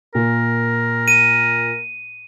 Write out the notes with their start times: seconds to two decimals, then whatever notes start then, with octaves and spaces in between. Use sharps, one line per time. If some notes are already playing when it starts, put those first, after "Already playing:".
0.15 A#2 A#4
1.08 D#7